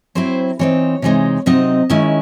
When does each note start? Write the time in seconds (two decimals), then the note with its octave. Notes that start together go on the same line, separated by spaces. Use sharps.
0.15 F#3 C4 E4 C5
0.59 E3 C4 D#4 C#5
1.02 C3 E3 G#3 D#4
1.46 C3 F#3 C4 D#4 D#5
1.90 D#3 G#3 C#4 E4